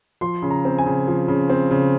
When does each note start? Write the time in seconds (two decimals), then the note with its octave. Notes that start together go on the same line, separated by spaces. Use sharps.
0.21 F3 C6
0.42 C#3
0.50 A#5
0.65 C4
0.78 G#5
0.86 C#3
1.07 F3
1.28 C#3
1.50 C4
1.71 C#3